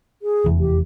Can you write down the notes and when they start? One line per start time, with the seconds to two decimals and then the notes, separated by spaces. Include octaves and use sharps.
0.22 G#4
0.44 F1 E2
0.60 G4